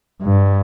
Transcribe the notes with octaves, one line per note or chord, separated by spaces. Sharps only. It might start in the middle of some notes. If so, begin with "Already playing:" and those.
G2